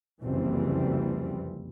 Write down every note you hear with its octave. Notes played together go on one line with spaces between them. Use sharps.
F#1 C2 F2 E3 G3 C4